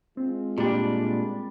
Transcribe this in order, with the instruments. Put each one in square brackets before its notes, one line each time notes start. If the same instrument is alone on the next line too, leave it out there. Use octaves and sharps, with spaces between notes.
[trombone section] G#3 F4 [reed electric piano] C4
[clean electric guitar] A#2 D4 [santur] G3